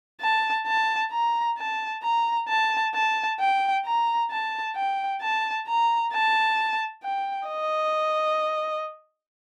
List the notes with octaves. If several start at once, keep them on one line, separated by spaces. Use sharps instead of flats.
A5
A5
A#5
A5
A#5
A5
A5
G5
A#5
A5
G5
A5
A#5
A5
G5
D#5